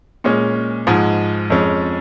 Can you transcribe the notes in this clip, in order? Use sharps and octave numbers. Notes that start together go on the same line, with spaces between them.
A#2 G#3 C#4
G#2 F3 G#3
F2 F3 G#3 C#4